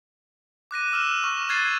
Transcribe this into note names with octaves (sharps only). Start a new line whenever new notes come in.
D6 F#6 A#6 D#7
D6 E6 F6 E7
C#6 F6
F6 F#6 G#6 A6 C7 D#7